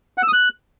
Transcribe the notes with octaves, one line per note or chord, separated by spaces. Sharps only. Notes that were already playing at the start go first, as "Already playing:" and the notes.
F#5
E6
D#6
F#6